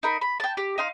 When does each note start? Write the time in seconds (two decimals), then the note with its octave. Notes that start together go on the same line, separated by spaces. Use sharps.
0.03 D#4 A#4 B5
0.21 B5
0.40 G5 A5
0.57 G4
0.78 D#4 F5 C6